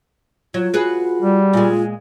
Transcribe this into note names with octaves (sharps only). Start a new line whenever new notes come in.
F#3 F4
F#4 G#4 B4
G3
A#2 G#3 F4